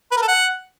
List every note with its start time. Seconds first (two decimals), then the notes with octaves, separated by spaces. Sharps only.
0.11 B4
0.17 A#4
0.22 A4
0.28 F#5